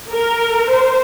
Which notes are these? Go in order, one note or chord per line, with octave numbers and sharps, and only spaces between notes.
A#4
C5